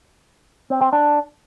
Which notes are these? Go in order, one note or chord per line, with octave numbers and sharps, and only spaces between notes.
C4
C4
D4